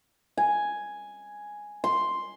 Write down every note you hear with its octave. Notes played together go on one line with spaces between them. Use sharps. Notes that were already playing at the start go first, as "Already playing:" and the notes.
G#5
C6